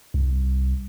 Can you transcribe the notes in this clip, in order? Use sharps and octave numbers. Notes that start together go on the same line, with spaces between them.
C2